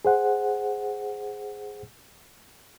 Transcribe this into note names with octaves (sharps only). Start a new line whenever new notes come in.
G#4 C5 F#5